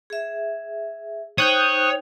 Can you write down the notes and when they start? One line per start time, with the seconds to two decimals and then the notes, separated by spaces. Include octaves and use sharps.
0.10 G#4 E5
1.38 D#4 C5 C#5 G5 D#6 F#6 G6